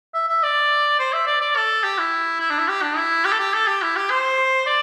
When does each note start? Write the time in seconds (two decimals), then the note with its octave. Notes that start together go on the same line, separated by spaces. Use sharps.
0.14 E5
0.28 E5
0.43 D5
0.99 C5
1.13 E5
1.27 D5
1.41 D5
1.56 A4
1.84 G4
1.98 E4
2.40 E4
2.50 D4
2.59 E4
2.69 G4
2.82 D4
2.97 E4
3.25 G4
3.32 A4
3.39 G4
3.54 A4
3.67 G4
3.82 E4
3.96 G4
4.10 C5
4.66 D5